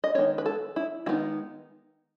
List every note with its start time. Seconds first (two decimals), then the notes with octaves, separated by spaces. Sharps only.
0.04 D#5
0.14 D#3 G#3 B3 D#4 C#5
0.38 B4
0.46 A4
0.76 E4
1.06 D#3 G#3 B3 D#4 E4